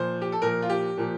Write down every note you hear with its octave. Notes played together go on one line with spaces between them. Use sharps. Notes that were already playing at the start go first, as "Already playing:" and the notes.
Already playing: A#2 F3 C5
G4
A4
A#2 F3 A#4
F4
G4
A#2 F3